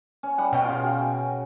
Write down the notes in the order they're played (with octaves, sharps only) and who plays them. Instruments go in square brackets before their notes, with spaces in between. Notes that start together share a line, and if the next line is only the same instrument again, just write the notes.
[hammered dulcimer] C#4
G3 F#5
[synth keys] B2 G5 [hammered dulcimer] C#4
[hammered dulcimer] C#3 F4
F#4